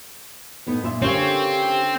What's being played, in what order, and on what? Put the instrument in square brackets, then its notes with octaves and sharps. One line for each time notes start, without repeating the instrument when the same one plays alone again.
[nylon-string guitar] A2 B3 D#4
[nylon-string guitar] A#2 E5 [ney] C6
[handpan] D3 C#4 C#5 [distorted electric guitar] C4 [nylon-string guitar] F4 A#4 F5 [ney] G4